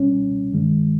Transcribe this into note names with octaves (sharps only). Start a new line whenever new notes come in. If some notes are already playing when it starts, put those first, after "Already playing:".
Already playing: C#2 B2 G3 C#4
G2 D#3 G#3